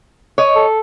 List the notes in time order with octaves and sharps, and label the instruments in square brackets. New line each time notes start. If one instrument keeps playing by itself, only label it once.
[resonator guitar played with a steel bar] C#5 D#5
[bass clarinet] A4